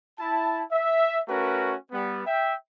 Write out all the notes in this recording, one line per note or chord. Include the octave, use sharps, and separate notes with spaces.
E4 A5
E5
A3 C#4 F#4 A#4 B4
G3 B3
E5 G5